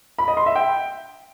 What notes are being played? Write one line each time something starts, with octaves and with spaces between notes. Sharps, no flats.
B5
D#5
C6
E5
G5